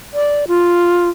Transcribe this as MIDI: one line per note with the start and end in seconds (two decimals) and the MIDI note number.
0.14 0.45 74
0.48 1.09 65